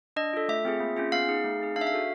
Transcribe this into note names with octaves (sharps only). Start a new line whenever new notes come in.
D4 D#5
F4 A4
A3 E5
C4 F4 G#4
A#3
C#4 F4 G#4
B3 F5
D#4 G#4
A3
C4 D#4 G#4
D4 F5
E5
F5
F#4 A4